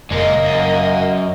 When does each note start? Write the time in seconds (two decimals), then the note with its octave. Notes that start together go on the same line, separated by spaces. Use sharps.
0.10 F#1 A#2 G#3 A#3 D#5
0.45 F#2